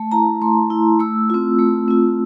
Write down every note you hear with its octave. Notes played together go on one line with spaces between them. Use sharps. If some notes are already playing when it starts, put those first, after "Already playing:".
Already playing: A3 A5
E4 A#5
A3 C6
E4
A3 E6
C4 F4
A3
C4 F4